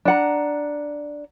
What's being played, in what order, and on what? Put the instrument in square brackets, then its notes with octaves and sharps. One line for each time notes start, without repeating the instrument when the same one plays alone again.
[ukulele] D4 F#5 A#5